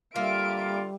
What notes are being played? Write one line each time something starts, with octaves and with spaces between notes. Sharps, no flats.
D3 G3 A#3 F4 E5 D7